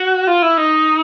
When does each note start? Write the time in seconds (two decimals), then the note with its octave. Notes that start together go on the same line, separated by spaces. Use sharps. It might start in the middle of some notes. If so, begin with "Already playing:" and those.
Already playing: F#4
0.27 F4
0.42 E4
0.57 D#4